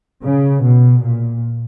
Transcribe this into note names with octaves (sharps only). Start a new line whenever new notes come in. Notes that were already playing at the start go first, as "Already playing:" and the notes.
C#3
B2
A#2